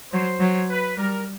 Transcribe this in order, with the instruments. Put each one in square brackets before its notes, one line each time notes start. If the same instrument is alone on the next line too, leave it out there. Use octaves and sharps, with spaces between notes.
[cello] F#3 [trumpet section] C5
[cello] F#3
[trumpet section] B4
[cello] G3 [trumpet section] A#4